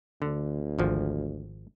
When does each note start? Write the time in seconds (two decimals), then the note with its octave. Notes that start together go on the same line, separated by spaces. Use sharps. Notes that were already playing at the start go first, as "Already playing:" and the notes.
0.22 D2 D3
0.79 G#1 F3